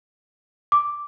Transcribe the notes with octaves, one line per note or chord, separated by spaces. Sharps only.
D6